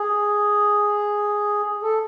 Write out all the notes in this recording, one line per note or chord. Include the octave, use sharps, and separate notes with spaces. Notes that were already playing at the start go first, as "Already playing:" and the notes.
Already playing: G#4
A4